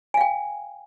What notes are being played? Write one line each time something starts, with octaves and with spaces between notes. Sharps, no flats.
F5 G5 G#5